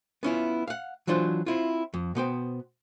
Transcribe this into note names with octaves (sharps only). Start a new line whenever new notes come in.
B3 C#4 E4 F4
F5 F#5
E3 F#3 D4 F4 C5
C4 E4 F4
F2
B2 B3 C5 G5